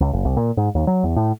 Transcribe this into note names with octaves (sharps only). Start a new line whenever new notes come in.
C#2
F#1
C2
A#2
G#2
D#2
F#3
E2
A2